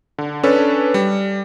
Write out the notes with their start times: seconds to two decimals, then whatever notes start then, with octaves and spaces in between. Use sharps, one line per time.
0.18 D3
0.43 C#4 D4 A4 B4
0.94 G3